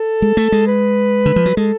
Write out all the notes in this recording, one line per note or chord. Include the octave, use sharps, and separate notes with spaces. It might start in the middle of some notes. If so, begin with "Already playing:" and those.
Already playing: A4
G#3
A3
G#3
B4
D3
F3
F#3
G#3 A4